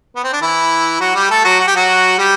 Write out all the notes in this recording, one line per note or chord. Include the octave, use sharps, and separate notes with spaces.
B3
C4
D4
E3 E4
F#3 F#4
G3 G4
A3 A4
F#3 F#4
F#4
G4
F#3 F#4
G3 G4